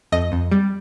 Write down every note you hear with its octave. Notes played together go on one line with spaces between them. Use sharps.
F2 D#5
F2
G3